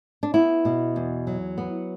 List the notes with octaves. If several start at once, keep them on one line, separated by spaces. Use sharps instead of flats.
D4
B3 E4
B2
E2
F#3
B3